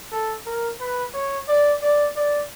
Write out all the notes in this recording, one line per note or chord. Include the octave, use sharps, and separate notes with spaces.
A4
A#4
B4
C#5
D5
D5
D5